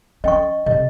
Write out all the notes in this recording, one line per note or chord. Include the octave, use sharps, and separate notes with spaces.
C#4 D#5 G5 C#6
C3 D#5